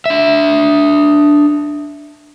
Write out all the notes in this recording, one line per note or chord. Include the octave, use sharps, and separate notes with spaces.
D4 E5